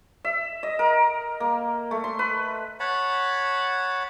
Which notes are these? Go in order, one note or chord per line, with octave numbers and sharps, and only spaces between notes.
E5
D#5
A#4
A#3
A3
C6
B4
C#5 F#5 A5 B5